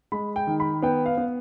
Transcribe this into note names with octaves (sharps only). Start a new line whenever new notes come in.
G#3 B5
G5
D#3
B5
B3 G5
F5
B3